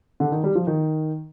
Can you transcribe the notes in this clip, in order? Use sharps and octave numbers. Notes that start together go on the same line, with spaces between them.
D3
D#3
G3
F3
D#3